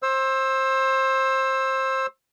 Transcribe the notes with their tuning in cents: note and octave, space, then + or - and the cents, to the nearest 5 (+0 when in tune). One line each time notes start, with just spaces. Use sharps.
C5 +25 E6 +0